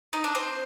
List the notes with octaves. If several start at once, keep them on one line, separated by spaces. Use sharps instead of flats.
D#4 D#5
D4 D5
C4 C5